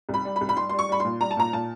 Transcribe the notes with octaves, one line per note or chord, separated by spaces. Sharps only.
C2
B5
G3
B5
C2
B5
G3 C6
C6
G3
C#6
G3 B5
A#2 C6
G3 A#5
A5
A#2 A#5
A#2 A5